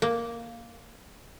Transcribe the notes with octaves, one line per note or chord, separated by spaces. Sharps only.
A#3